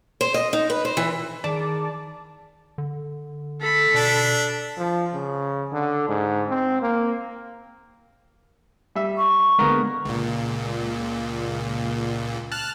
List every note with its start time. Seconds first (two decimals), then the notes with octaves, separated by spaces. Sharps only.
0.21 C5
0.34 D#5
0.53 D#4
0.70 B4
0.85 C5
0.97 E3
1.44 D#3 G#4 D5 A5 D6
2.78 D3
3.61 A4 B5
3.94 B2 D4
4.78 F3
5.14 C#3
5.72 D3
6.08 G#2
6.49 C4
6.82 A#3
8.95 G3 E5
9.17 C#6
9.59 D3 G#3 A#3 B3 A#4
10.05 C#2 A#2
12.52 A5 F6 F#6